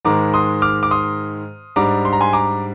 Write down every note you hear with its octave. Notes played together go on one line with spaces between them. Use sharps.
G#2 D#3 G#3 A#5 D6
C6 D#6
D6 F6
D6
C6 D#6
G#2 G3 D4 A#5 D6
C6
A#5
G#5 C6
A#5 D6